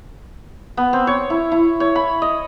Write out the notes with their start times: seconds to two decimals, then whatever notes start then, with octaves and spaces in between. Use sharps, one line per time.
0.77 B3
0.93 C4
1.07 C#5
1.30 E4
1.52 E4
1.80 C#5
1.95 B5
2.22 D#5